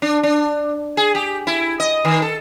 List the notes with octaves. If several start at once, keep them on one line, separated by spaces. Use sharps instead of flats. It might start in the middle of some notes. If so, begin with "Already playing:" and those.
D4
D4
G#4
G4
E4
D#5
D#3
A4